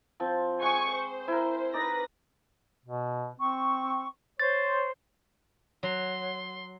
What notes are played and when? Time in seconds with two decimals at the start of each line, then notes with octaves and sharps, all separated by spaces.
0.20 F3 C4
0.61 G#3 F#5 G#5 C#6
0.94 C5
1.28 E4 A#4
1.73 D#4 B4 D5 A#6
2.86 B2
3.40 C4 C#6
4.40 C5 C#5 A6
5.83 F#3 C6